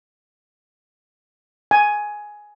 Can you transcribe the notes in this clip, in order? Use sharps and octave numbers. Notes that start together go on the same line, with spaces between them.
G#5